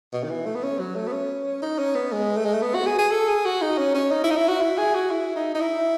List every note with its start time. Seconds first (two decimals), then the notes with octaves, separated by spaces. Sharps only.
0.13 B2
0.24 D#3
0.30 E3
0.46 A3
0.55 B3
0.63 C#4
0.80 F#3
0.96 A3
1.07 B3
1.13 C#4
1.62 D#4
1.79 C#4
1.95 B3
2.12 G#3
2.37 A3
2.45 G#3
2.54 A3
2.62 B3
2.75 F#4
2.87 G#4
2.99 G#4
3.12 A4
3.29 G#4
3.46 F#4
3.62 D#4
3.78 C#4
3.95 C#4
4.11 D#4
4.24 E4
4.31 D#4
4.37 E4
4.49 F#4
4.61 E4
4.78 G#4
4.95 F#4
5.11 E4
5.36 D#4
5.55 D#4
5.61 E4